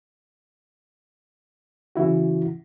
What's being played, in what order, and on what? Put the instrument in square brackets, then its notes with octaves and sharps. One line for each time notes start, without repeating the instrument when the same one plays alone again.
[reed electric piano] C#3 E3 E4 F#4